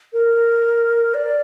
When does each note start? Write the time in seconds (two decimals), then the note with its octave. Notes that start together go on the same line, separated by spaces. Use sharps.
0.13 A#4
1.14 D5